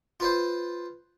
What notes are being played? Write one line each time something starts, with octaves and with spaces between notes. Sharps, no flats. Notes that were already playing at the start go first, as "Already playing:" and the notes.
F4 B4 C5